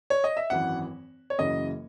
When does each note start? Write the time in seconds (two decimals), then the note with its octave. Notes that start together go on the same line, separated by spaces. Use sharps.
0.10 C#5
0.24 D#5
0.37 E5
0.50 G#1 F#2 E3 F#5
1.30 C#5
1.39 F#1 F#2 C#3 E3 D#5